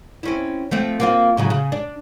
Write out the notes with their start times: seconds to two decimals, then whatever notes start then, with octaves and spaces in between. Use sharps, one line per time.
0.23 C4 C#4 E4
0.71 F3 A3 C4
1.00 A#3 C4 F4
1.37 A2 C#3 F#3
1.50 C#3
1.72 D4